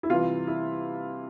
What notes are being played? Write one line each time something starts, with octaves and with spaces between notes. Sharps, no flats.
E4
C3 E3 G3 F4
E4